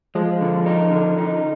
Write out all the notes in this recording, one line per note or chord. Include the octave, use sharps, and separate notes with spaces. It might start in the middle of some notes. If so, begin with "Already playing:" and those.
F3 G#3
D3
D#4
D3
F3 D#4